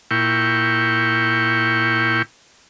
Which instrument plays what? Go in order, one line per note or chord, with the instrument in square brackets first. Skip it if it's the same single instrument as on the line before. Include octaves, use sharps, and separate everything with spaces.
[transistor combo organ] A#2 E4 G5 C#6